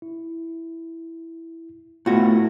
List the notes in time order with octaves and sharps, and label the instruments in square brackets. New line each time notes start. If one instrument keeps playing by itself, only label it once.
[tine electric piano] E4
[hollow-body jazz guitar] A2 F#4 [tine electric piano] A3 B3 F4